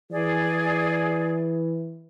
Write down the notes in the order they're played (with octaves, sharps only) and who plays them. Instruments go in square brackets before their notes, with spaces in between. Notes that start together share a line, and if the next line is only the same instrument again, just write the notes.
[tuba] E3 [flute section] G#4 D5